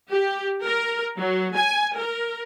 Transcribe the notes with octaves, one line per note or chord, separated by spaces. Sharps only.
G4
A#4
F#3
G#5
A#4